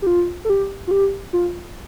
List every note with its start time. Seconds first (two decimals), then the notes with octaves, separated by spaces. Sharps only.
0.02 G4
0.07 F4
0.45 A4
0.50 G4
0.87 F4
0.91 G4
1.33 F4